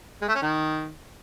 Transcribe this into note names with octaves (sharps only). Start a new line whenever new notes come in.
G#3
A3
C#4
D#3